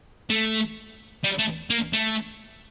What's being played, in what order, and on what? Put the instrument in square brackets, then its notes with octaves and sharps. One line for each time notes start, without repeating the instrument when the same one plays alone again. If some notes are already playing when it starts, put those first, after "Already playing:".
[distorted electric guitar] A3
G3
A3
A#3
A3